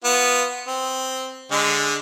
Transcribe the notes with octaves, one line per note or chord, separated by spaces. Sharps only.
B3 F4
C4
D3 G#3